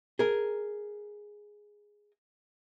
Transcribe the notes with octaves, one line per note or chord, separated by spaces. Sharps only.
G#4 A#4